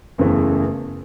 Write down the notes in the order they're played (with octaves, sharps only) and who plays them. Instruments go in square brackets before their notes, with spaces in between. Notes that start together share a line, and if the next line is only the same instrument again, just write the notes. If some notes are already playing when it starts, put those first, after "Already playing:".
[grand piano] F#1 E2 C#3 E3 A3